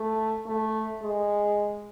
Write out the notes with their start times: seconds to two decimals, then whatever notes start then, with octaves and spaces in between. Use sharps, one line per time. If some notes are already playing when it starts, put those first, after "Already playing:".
Already playing: A3
0.46 A3
1.02 G#3